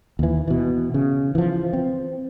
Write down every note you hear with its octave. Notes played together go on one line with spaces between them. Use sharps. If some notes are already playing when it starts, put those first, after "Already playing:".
D#2 E3
B2 E3
C#3
E3 F3
C4